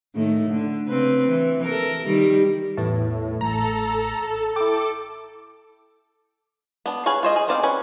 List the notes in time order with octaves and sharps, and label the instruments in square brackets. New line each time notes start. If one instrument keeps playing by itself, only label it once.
[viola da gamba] A2 D#3 A3
D3
C#3 C4 B4
E3
A4 A#4
D#3 G3
[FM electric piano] E2 B3 A5 [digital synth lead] A2
[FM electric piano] A1 A2 [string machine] A4 [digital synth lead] A#5
[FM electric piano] E4 G5 [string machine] A4 [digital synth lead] D6
[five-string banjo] B3 D4
G#4 B4 C#5 F5
F4 C5 D#5
G#4
B3 C4 D#4 D5 F5
C#4 B4